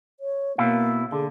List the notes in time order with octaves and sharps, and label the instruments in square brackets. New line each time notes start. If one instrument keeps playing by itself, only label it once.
[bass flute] C#5
[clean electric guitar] B2 E4 F5 [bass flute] A#3
[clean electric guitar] D3 [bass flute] G#4